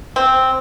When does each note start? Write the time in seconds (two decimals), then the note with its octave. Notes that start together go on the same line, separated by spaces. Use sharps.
0.16 C4